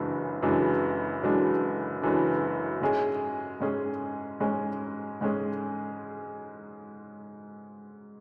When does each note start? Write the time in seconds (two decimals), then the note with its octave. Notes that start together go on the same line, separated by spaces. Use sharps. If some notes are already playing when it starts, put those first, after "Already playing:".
Already playing: F#1 F#2 E3 G#3 D4
0.42 F#1 F#2 E3 G#3 D4
1.22 F#1 F#2 E3 G#3 D4
2.02 F#1 F#2 E3 G#3 D4
2.81 G#2 G#3 C#4 G#4
3.60 G#2 G#3 C#4 G#4
4.40 G#2 G#3 C#4 G#4
5.21 G#2 G#3 C#4 G#4